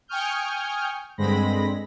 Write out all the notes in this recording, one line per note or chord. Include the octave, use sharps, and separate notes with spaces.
G5 G#5 C#6 D#6 F6 G6
G2 D3 G#3 C4 B5 A#6